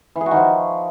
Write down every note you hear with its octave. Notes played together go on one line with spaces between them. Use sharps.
E3
G#4
F#4
D#3
F3